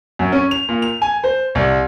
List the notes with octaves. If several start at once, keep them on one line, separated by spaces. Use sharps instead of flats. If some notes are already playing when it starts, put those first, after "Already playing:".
F#2
C#4
F7
A#2
F7
G#5
C5
C2